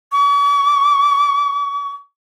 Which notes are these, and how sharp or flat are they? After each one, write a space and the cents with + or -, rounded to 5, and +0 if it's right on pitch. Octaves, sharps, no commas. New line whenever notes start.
C#6 +45